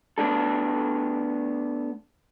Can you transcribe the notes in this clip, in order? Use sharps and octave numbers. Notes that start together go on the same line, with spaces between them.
A3 B3 D4 A4